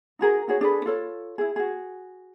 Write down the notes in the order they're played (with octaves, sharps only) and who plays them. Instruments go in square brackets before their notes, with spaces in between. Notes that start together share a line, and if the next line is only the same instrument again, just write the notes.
[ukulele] D#4 F#4 G#4 A#4
D#4 F#4 G#4 C#5
D4 G#4 A4 B4
F4 A4 C#5
E4 G#4
F#4 G#4